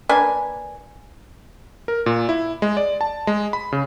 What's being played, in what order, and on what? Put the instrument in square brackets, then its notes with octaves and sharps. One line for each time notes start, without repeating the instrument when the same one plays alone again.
[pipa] A#3 D4 B4 G#5
[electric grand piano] A#4
A#2
E4
G#3
D5
A5
G#3
B5
C#3